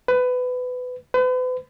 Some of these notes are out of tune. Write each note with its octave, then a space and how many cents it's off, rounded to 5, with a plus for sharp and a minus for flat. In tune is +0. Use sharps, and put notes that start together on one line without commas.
B4 +20
B4 +40